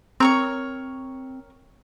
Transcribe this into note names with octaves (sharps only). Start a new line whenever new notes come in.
C4 A#4 C#5 C#6